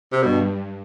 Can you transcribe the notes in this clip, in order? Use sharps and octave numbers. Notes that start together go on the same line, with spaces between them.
C3
G2 B2